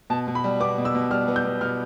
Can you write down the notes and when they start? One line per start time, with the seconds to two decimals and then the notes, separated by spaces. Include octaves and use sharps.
0.10 B2 A5
0.28 B2
0.35 B5
0.44 G3
0.60 B3 D6
0.78 B2
0.85 E6
0.95 B2
1.11 G3 F6
1.28 B3
1.36 G6
1.45 B2
1.61 B2 F6